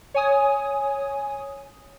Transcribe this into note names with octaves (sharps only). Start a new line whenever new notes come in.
C#5 G#5 D#6